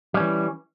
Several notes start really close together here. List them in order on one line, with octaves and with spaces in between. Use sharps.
G3 C#4 E3